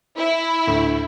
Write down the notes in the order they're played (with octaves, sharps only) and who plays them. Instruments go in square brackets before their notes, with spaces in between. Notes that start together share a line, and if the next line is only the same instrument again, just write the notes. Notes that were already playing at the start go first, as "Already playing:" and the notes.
[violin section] E4
[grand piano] D2 A2